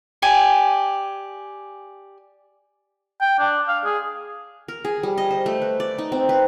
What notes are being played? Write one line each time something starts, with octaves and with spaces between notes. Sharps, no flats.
G4 D5 G#5
G5
D4
F5
G#4
A#4
G#4
G3
D#5
C5
A3
B4
D5
D#4
C4
B4